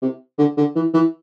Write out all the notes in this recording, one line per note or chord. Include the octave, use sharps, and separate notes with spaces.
C3
D3
D3
E3
E3